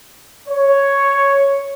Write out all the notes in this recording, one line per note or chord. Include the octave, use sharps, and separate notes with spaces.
C#5